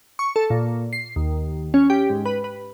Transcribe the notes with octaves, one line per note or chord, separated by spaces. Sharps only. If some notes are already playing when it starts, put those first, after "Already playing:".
C#6
A4
A#2
C7
D#2
C#4
G4
G#2
B4
B4